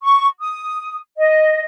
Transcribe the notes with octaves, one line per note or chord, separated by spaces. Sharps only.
C#6
D#6
D#5